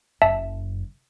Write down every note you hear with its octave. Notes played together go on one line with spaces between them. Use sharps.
F#1 F#2 E5 A5